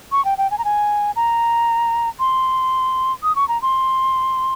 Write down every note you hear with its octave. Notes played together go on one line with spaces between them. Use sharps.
C#6
G5
G5
G#5
A#5
G#5
A#5
C6
D#6
C#6
A#5
C6